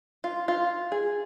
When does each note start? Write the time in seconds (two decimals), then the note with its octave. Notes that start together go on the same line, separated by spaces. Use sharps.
0.24 F4
0.48 F4
0.92 G#4